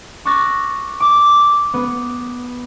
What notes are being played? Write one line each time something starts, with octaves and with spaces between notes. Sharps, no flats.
C#6 D6 E6 F#6 A6 A#6
D6
B3